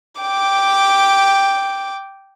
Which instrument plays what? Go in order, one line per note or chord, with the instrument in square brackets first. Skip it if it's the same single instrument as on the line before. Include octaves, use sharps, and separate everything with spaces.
[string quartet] G5 D6